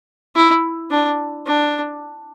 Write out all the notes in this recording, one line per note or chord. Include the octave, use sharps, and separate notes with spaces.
E4
D4
D4